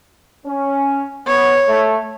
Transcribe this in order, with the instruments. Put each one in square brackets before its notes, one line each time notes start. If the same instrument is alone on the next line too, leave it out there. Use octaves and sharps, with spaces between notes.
[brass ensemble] C#4
[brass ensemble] B3 [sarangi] C#5
[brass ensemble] A3